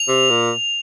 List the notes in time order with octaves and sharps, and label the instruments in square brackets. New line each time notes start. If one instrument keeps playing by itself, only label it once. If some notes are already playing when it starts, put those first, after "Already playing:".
Already playing: [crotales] F7
[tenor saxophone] C3
A#2